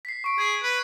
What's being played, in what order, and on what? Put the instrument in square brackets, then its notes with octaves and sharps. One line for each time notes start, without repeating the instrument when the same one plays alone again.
[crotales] B6 C7
C#6 D7
[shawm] G#4 [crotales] G#6
[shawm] B4